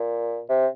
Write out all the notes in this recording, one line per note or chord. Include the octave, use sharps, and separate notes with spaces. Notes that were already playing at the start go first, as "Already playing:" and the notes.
Already playing: A#2
C3